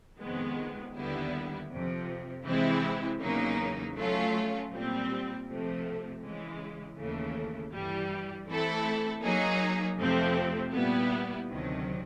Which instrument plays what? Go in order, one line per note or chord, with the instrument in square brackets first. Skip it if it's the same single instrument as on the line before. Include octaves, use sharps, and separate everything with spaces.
[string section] F2 C3 D#3 G#3 B3
D#2 D3 G3 B3 E4
F2 C3 F3
C3 E3 G#3 C4 E4
E2 C#3 F#3 A#3 D#4
F#3 A3 C#4 F4
A#2 G3 C4
C3 F3 A3
C#3 E3 G#3
D#2 C#3 E3 A3
G2 E3 G3
E3 A3 C4 E4 A4
F#3 A#3 D#4 G#4
F2 C3 F3 A3 C4
A#2 G3 B3 E4
D2 C3 D#3 F#3